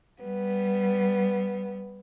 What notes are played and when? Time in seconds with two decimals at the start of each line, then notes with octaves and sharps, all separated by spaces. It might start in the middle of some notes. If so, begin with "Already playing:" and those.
0.22 G3 B3